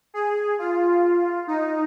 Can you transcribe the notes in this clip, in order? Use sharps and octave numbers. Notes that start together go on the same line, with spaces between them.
G#4
F4
D#4